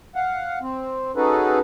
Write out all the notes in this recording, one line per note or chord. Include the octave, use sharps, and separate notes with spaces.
F5 F#5
C4
C#4 D#4 F#4 G#4 A4 B4